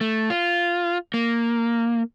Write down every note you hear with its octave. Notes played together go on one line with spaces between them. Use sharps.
A3
F4
A#3